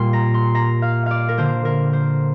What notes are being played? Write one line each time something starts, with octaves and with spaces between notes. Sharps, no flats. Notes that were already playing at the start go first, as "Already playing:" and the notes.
Already playing: A#2 G3 A#3 C6
A#5
C6
A#5
F5
D5 F5
A#4
D3 A#3 C5
A#4
C5